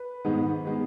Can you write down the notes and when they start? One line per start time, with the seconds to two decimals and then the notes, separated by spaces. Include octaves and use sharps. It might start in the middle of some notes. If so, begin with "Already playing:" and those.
Already playing: B4
0.24 G#2 D#3 G#3 B3
0.65 D#3 G#3 B3